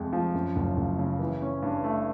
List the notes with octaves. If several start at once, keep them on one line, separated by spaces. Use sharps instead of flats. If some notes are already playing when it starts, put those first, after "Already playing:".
Already playing: F2 C3 G#3
F3
F#2
F#1
F#1
C#3
E3
C#4
G2
A3